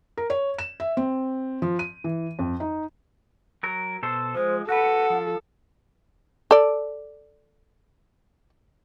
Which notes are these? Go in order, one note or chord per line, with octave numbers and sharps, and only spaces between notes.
A#4
C#5
E7
E5
C4
F3
D#7
E3
F2
D#4
F#3 A#4
B2 A4 C5
F3 G#3 C5
F#4 A4 B4 F#5
F3
A4 D5